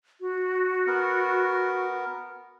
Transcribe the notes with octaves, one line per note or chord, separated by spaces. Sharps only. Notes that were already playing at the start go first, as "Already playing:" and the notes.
F#4
B3 A#4